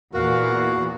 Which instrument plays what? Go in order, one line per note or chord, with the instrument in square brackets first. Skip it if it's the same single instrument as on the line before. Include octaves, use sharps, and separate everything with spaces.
[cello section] E2 A#2 [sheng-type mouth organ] F#4 [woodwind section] A#4 F5